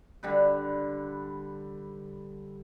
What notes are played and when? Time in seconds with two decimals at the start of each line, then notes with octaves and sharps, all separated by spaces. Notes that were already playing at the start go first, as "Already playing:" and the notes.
0.23 D3 G3 B4